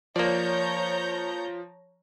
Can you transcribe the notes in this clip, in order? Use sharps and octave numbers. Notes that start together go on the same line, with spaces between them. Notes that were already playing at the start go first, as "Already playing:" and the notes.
F3 A#3 C#5 D5 A#5 G6